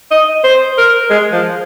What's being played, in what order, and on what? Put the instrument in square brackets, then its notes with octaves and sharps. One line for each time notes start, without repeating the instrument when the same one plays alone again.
[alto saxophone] D#5
C5
A#4
G#3
F3